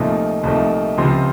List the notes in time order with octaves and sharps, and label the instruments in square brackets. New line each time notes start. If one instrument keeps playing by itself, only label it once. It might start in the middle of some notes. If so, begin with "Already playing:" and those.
Already playing: [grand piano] C2 A#2 F3 A3 D#4
C2 A#2 F3 A3 D#4
C#2 C3 F3 C4 F4